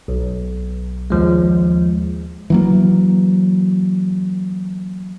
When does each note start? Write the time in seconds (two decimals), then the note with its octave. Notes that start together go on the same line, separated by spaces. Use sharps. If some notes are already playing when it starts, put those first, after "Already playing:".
0.08 B1
1.10 D#2 F3 G#3
2.50 E3 F#3 A#3